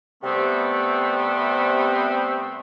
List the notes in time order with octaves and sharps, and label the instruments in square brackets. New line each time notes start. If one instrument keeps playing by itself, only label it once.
[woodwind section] C3 G3 A3 B3 C4